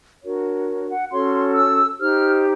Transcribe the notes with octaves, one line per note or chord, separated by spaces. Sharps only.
D4 F#4 A#4 C#5
F#5
C#4 F#4 A4 C#5 C6
E6
D#4 G4 C5 F6